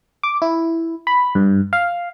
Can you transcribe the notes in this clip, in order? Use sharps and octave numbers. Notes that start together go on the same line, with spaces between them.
D6
E4
B5
G2
F5